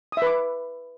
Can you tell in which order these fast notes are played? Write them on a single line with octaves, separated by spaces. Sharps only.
D#6 E5 B4 D6